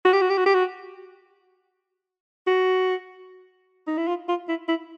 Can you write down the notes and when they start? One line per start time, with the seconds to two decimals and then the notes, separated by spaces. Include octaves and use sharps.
0.05 F#4
0.13 G4
0.21 F#4
0.30 G4
0.37 F#4
0.46 G4
0.54 F#4
2.47 F#4
3.88 D#4
3.97 E4
4.08 F4
4.28 F4
4.49 E4
4.68 E4